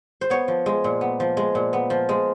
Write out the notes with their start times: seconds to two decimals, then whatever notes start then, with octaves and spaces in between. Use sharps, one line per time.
0.21 C5
0.30 B3 C#5
0.48 F3
0.66 G#3
0.84 A#2
1.01 B3
1.20 F3
1.37 G#3
1.55 A#2
1.73 B3
1.90 F3
2.09 G#3